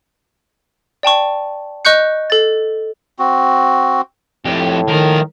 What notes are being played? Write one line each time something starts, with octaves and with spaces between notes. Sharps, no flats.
D5 G5 A5 C#6
D#5 C#6 F#6 G6 C#7
A4 A6
C4 F#4
F2 A2 G4
D#3 F3 A#4